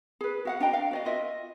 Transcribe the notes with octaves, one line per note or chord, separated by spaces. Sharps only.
G#4 B4
F#4 F5 F#5
D4 D#5 G5 A#5
F5
F#4 D5 D#5
F4 D#5 E5